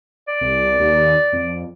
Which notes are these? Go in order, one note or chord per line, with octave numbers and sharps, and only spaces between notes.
D5
C2
D#2
F2